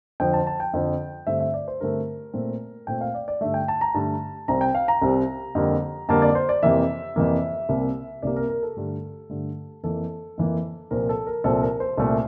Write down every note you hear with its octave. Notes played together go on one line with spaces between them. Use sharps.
F2 D3 F3 C4 G5
A5
A5
G5
F2 D3 F3 C4
G2 D3 A3 C4 E5
E5
D5
C5
G2 D3 A3 C4 A#4
A#2 A3 C4
A#2 A3 C4 G5
F5
D5
D5
G2 D3 A3 E5
G5
A5
A#5
G2 D3 A3 A5
C2 C3 G3 C4 A#5
G5
F5
A#5
C2 C3 G3 C4
F2 D3 G3 A#3
F2 D3 G3 A#3 A5
D5
C5
D5
F2 C3 E3 A#3 E5
F2 C3 E3 A#3
C2 C3 G3 A#3
C2 C3 G3 A#3 D5
A#4
A#4
A4
G2 D3 A3
G2 D3 A3
F2 E3 A#3 A4
F2 E3 A#3
C2 A#2 F3 C4 A#4
A4
A#4
C2 A#2 F3 C4 A4
A#4
C5
C2 A#2 A3 C4